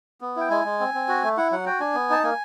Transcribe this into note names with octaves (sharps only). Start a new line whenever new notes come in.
B3
E4 G5
G#3 G#5
G#3
C4
C4
F#4
A3
E4 F#5
F#3 F#5
F#4 G5
D4 G#5
B3
D#4 A5
A#3 G#5